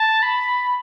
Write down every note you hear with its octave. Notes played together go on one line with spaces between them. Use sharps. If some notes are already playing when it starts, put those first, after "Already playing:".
Already playing: A5
B5